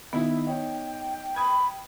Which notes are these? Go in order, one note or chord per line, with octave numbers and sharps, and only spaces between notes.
D#3 B3 D#4 E4 E5
D#4 C#5 G5
B5 D#6 G#6